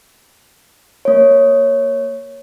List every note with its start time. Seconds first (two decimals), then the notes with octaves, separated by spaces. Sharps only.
1.05 A#3 C#5